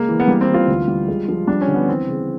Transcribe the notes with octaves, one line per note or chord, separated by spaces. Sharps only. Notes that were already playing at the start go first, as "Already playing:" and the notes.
Already playing: C#3 G#3 A#3
E3
B3
G3 A#3
C4
E3
F4
D2
G3
G#3
F3
G3 D4
C#4
D3
B3
E3 C4
C#3